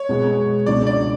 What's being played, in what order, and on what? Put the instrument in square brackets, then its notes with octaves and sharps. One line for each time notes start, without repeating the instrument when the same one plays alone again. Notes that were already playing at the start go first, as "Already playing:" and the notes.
Already playing: [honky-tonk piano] C#5
[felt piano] B2 G#3 B3
[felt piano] C#2 B2 G#3 D4 [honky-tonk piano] D5
[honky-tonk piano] D5